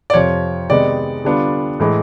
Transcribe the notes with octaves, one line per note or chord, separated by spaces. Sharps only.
D5
F2 C3 F3 C#5
C3 D#3 G#3 B3 D#4 D5
D3 G3 B3 D4 F4
A2 E3 G#3